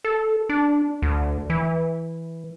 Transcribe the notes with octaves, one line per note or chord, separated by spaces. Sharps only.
A4
D4
D2
E3